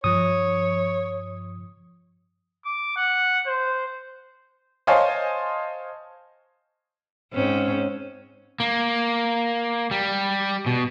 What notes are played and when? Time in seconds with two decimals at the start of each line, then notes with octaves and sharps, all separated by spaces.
0.04 G2 F3 C#5 D#6
2.65 D6
2.96 F#5
3.47 C5
4.87 C5 C#5 D#5 F5 G#5 A5
7.33 G#2 C4 C#4
8.60 A#3
9.91 G3
10.66 B2